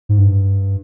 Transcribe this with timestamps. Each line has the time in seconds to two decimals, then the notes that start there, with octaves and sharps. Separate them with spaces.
0.09 G#2
0.18 G2